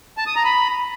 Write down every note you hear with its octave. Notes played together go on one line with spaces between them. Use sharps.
A5
D#6
A#5
B5